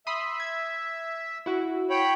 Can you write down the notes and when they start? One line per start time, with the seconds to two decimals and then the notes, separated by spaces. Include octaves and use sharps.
0.07 E5 B5 C6 D#6
0.40 G#6
1.46 E4 F#4
1.90 C#5 G5 B5